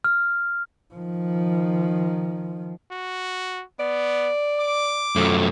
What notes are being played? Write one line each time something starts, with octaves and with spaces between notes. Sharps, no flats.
F6
D#3 F3
F#4
B3 D5
D6
F#2 A3